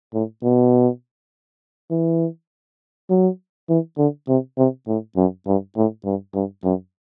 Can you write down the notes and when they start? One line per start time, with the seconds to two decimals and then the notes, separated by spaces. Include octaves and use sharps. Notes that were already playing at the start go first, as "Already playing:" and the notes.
0.14 A2
0.44 B2
1.91 E3
3.10 F#3
3.69 E3
3.98 D3
4.28 C3
4.58 C3
4.88 A2
5.16 F#2
5.47 G2
5.76 A2
6.05 G2
6.35 G2
6.64 F#2